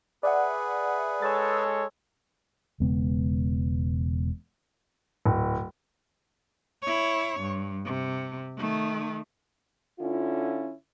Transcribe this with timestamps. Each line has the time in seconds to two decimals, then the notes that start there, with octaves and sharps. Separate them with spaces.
0.23 G#4 B4 D5 E5 F#5
1.22 G#3 A4 C#5 E6 A6
2.80 E1 C#3 G#3 B3
5.26 D1
6.83 E4 C#5
7.41 G2
7.85 C3
8.57 D#3 A3
9.99 D3 C#4 E4 F4